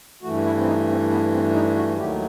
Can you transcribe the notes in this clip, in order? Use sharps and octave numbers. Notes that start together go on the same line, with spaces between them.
G2 E3 A3 F#4
E4
C4
D#4
C4
B3
C4
D#4
F#4
D#2 D#3 F#3 A3 G4